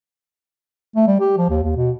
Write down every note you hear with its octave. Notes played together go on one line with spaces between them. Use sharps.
A3
G3
G4
F3
D#2
D#2
B2